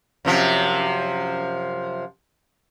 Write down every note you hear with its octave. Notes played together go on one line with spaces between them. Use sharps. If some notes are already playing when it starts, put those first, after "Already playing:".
F#2 C3 F3